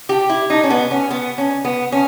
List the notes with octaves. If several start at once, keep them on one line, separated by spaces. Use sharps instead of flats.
G4
E4
D#4
C#4
B3
C#4
B3
C#4
B3
C#4